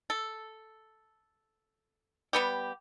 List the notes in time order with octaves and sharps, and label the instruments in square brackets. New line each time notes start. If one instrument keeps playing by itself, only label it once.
[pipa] A4
G3 B3 G4